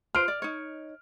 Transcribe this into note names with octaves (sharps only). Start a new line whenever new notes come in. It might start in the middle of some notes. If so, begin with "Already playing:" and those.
F4 B4 C5 F6 D7
D5
D#4 C#5